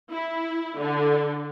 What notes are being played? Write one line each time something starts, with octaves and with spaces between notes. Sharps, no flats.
E4
D3